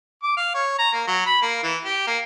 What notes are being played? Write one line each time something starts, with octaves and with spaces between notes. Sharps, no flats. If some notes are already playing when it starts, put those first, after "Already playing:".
D6
F5
C#5
A#5
A#3
F#3
B5
A#3
E3
G4
A#3